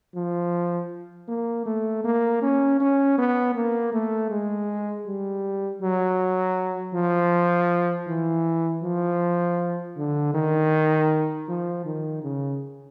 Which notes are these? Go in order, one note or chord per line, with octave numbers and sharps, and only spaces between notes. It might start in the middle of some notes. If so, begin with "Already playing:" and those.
F3
A#3
A3
A#3
C#4
C#4
B3
A#3
A3
G#3
G3
F#3
F3
E3
F3
D3
D#3
F3
D#3
C#3